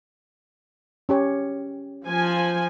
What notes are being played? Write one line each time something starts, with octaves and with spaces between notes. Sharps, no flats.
C#4 G4 C#5
F3 G#5